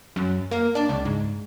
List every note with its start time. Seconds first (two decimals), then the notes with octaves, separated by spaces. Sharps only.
0.16 F#2
0.51 A#3
0.75 D4
0.89 C#2
1.05 G#2